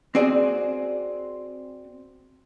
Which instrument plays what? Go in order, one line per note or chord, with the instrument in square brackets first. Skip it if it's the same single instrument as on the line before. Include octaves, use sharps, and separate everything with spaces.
[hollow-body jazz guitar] C4 F#4 G#4 D5